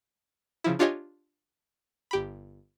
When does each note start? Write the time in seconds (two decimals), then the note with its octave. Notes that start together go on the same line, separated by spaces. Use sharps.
0.64 C#3 F3 E4
0.79 D4 F4 G4 C#5 D#5 G#5
2.11 G1 G4 B5